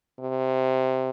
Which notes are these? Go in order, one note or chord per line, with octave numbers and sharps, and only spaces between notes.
C3